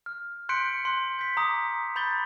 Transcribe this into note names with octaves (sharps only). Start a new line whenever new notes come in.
F6
C6 F#6 G6 B6 C#7 D7
C6 F#6
G6 B6
A#5 D6 D#6
A#5 B5 G6 A6 G7